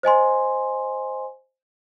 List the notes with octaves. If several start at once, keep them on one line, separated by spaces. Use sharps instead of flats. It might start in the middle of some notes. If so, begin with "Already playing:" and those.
C5 D#5 G#5 C6